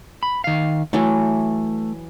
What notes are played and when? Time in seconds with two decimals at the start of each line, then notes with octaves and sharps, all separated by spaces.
0.23 B5
0.44 D#3 F5
0.93 E3 F#3 A3